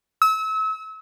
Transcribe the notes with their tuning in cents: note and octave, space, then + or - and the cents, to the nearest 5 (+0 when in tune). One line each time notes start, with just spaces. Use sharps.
E6 -35